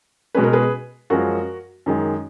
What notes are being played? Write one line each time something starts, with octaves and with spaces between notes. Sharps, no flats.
B2 G#3 C#4 B4
A#4
G#4 B4
F#2 F3 G#3 C#4 F#4 A#4
F#2 D#3 G#3